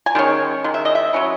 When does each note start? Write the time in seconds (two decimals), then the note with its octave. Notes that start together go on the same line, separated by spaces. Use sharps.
0.06 G#5
0.15 D#3 G#3 C#4
0.64 D#3 G#3
0.74 E5
0.85 D#5
0.95 E5
1.13 F#3 C#4 E4